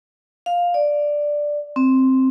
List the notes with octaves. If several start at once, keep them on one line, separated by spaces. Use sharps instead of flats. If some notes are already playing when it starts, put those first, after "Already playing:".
F5
D5
C4